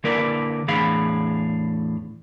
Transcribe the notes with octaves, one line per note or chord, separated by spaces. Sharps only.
D3 A#3 E4 A#4 B4 D5
E2 A2 D4 G#4 F5 B5